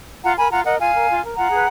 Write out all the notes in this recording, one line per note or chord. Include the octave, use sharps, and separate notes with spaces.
F4 F#5 A#5
A#4 G#5 B5
F4 F#5 A#5
A#4 D#5 F#5
F4 F5 G#5
A#4
F4
A#4
F4 F#5 A#5
G#4 B4